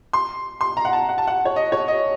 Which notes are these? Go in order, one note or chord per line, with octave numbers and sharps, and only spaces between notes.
C6
C6
A#5
F#5
A5
F#5
A5
F#5
C#5
D#5
C#5
D#5